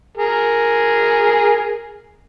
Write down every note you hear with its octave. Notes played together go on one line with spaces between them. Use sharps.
G#4 A#4